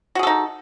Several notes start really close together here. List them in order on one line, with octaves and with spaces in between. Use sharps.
F#4 G#4 A4 D#4